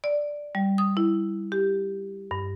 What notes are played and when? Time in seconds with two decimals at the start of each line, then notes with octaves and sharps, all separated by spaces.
0.04 D5
0.55 G3
0.78 D#6
0.97 E4
1.52 G4
2.31 G2